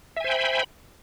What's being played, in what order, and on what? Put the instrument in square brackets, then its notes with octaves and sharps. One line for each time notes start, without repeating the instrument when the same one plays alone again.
[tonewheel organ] E5
G#5
C5
G5
B5